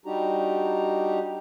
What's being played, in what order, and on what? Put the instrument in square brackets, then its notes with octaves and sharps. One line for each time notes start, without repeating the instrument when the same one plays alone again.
[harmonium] G3 D4 D#4 F#4 G4 A#5